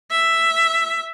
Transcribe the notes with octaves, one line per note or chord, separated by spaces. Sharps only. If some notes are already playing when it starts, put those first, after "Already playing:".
E5